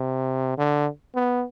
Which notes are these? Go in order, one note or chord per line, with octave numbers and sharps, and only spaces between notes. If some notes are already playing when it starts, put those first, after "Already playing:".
Already playing: C3
D3
B3